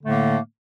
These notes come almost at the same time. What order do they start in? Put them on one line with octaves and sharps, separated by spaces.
D3 A3 A2 A#3